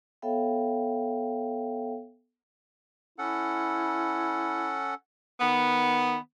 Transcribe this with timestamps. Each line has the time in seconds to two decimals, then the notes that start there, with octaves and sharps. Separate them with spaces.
0.22 B3 A4 C#5 E5 F5 G5
3.19 C#4 E4 A4 F#5
5.41 D#3 B3